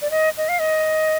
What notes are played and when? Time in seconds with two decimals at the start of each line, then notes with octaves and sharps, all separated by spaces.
0.02 D5
0.11 D#5
0.37 D#5
0.49 F5
0.59 D#5